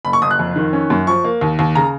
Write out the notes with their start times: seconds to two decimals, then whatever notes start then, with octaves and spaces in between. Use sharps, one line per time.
0.05 F#1 B5
0.13 C#6
0.22 F#1 D#6
0.31 F#6
0.39 F2
0.56 D#3
0.73 C#4
0.90 F#2
1.07 F3 C#6
1.24 A#3
1.41 D#2
1.59 D#2
1.75 C#3 A#5